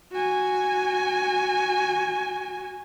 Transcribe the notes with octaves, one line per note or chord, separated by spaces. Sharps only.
F#4 G#5